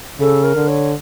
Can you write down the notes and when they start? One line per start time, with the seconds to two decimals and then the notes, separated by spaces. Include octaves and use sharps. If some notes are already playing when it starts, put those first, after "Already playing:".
0.19 C#3 A4
0.43 A#4
0.55 D3
0.68 C#5